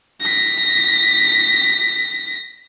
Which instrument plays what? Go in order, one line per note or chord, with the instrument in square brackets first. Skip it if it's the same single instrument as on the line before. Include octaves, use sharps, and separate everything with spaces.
[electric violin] A#6 B6